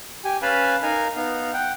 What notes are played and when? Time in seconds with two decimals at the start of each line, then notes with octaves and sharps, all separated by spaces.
0.24 G4 G#5
0.42 C#4 B4 F5 G#5 A5 B5
0.82 D#4 A#4 F5 G#5
1.16 B3 D#4 F5
1.53 F#5 G5